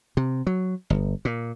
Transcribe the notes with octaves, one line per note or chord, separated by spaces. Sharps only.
C3
F#3
G1
A#2